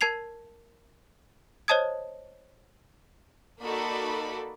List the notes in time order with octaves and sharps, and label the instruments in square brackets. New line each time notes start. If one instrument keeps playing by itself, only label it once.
[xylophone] A#4 A5 G#6 C7 F7
C5 C#5 D#5 A5 D#6 G#6
[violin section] A#3 D#4 F#4 A4 D5 B5